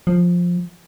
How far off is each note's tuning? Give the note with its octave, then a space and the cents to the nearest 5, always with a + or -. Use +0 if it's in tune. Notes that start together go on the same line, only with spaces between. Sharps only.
F3 +10